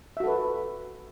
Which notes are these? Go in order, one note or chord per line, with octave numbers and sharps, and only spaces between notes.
F#4 A4 B4 E5